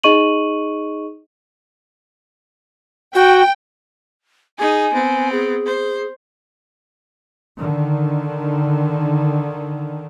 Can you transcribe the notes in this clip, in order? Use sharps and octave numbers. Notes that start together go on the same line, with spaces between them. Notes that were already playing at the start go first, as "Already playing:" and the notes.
D#4 G#4 D#5 C#6 D#7 F#7
F#4 G5
D#4 G#4 G#5
B3 C4
G#4
C5
D3 D#3